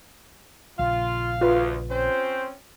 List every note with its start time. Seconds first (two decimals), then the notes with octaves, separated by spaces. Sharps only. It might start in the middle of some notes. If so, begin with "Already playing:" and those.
0.79 A#1 A#2 C#3 F4 F5
1.41 D2 F4 B4
1.91 C4 C#4 C5